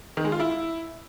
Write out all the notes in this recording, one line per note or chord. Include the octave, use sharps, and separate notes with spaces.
D#3
G#3
F4
E4